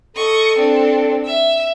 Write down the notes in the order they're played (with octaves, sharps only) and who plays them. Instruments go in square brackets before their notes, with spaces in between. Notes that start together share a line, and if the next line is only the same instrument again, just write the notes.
[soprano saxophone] A4 [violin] D#5 C#6
[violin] C4 D4
E5